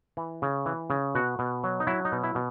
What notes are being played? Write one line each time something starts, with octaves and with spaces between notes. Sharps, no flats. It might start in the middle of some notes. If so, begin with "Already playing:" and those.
E3
C#3
E3
C#3
B2 F#4
B2
F#3
D#4
F#3 E4
D#4
B2
E4
B2